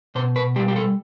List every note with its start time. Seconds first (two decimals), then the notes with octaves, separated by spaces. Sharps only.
0.15 B2 C5
0.36 B4
0.56 G3 G4
0.68 G4
0.76 A4